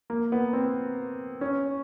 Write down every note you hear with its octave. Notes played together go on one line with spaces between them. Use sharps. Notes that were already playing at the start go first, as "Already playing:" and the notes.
A#3
B3
C4
C#4